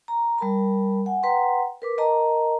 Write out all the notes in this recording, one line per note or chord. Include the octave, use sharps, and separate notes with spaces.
A#5
G3 A#4 A5 B5
F#5 G#5
B4 F#5 G5 A#5 C6
A#4 B4 D6
A#4 D#5 A5 A#5